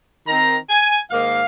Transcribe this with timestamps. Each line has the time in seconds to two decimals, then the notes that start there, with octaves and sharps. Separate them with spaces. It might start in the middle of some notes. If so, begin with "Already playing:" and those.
0.27 D#3 C4 A#5
0.69 G#5
1.11 G#2 D#3 A#3 F5